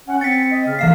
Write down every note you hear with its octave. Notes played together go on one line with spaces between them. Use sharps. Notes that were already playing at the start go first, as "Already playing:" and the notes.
C#4 F#5
C4 A6 B6 C#7
D#5
C#3 F6
E3 A#3 F5 C7